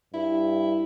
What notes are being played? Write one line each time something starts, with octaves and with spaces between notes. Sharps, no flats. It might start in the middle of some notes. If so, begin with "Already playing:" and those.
G2 E4